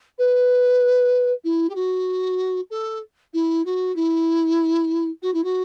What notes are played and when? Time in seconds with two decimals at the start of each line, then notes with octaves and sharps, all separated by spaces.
0.18 B4
1.44 E4
1.69 G4
1.75 F#4
2.70 A4
3.33 E4
3.65 F#4
3.96 E4
5.22 F#4
5.34 E4
5.44 F#4